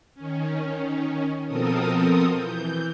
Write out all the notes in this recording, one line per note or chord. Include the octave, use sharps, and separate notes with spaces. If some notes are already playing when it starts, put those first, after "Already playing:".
D#3 C#4
B2 F3 C4 A4 A#4 D#6
E3 G6